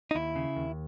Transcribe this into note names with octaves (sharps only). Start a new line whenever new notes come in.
D#4
D#2 E4
C#3
D#2